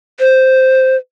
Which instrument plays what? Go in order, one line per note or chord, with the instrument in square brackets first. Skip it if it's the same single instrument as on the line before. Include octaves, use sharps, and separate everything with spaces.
[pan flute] C5